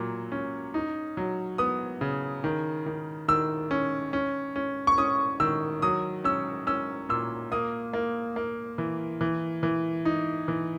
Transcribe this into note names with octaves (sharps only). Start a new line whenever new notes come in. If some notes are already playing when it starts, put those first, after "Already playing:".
Already playing: A#2 F#3
C#4
D#4
F#3
B3 D#6
C#3
D#3
D#3
D#3 E6
C#4
C#4
C#4
C#6
C#4 D#6
D#3 E6
F#3 D#6
C#4 E6
C#4 E6
A#2 E6
A#3 D#6
A#3
A#3
E3
E3
E3
D#4
E3